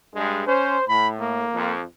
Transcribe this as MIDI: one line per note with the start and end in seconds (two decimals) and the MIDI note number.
0.15 0.46 43
0.15 0.46 56
0.47 0.77 61
0.47 0.84 72
0.89 1.46 45
0.89 1.08 83
1.21 1.73 58
1.54 1.82 41